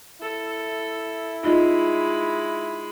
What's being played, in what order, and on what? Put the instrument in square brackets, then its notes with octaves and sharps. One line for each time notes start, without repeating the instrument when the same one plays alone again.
[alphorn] E4 [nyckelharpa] A4
[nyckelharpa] G#3 B5 [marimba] D#4 F4 D#5